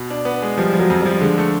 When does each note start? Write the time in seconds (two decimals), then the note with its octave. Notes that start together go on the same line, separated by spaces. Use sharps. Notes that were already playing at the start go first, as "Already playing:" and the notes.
Already playing: B2
0.10 D4
0.25 B3
0.42 G#3
0.58 F3 G3
0.73 F3
0.80 F#3
0.90 F2
1.00 G3
1.06 F3
1.21 D3 G#3
1.38 A3